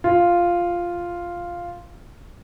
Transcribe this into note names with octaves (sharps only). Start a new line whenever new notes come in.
F4